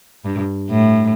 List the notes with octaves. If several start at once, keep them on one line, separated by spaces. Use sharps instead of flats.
G2
A2